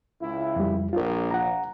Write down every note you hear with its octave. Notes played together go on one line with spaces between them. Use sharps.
C#2 E4
F2 G3
A#1 F4 A#4
F#5 A#5